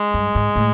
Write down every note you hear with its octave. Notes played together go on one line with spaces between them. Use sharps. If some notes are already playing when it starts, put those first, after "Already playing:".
Already playing: G#3
G2
G#2
A2